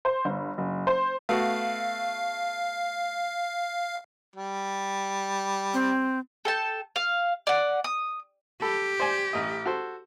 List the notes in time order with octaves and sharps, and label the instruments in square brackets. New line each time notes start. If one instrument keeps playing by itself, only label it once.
[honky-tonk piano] C5
G1
F#1
C5
[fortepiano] A3 B3 F#4 [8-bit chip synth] F5
[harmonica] G3
[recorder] C4
[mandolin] A4 G5 A5
F5
D5 F#5
D#6
[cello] G4 [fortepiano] A4 B5
[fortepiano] C5 D5 G#5
A1 D#5
F#4 A4 C5